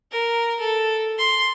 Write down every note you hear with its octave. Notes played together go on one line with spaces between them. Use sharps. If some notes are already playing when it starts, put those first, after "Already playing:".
A#4
A4
C6